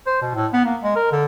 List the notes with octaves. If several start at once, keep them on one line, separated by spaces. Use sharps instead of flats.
C5
B2
A2
B3
A#3
G#3
A#4
D3